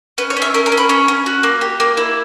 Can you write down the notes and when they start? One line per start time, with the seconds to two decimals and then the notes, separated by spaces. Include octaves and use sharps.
0.18 C#4 B4
0.30 C#5
0.37 C#4
0.42 E5
0.54 C#4 A#4
0.66 A#4
0.72 C#4
0.77 B4
0.89 C#4 C#5
1.08 C#4
1.26 F#4
1.43 A#3
1.61 G4
1.80 A#3
1.97 E4